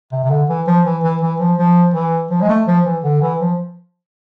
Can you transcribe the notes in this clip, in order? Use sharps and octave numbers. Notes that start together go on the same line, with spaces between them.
C3
C3
D3
E3
F3
E3
E3
E3
F3
F3
E3
F3
G#3
A3
F3
E3
D3
E3
F3